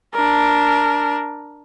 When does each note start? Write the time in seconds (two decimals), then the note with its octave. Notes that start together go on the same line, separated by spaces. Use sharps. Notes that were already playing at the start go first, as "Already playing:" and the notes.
0.14 D4 A#4